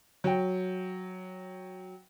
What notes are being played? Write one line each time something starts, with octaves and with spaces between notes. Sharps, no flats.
F#3 G5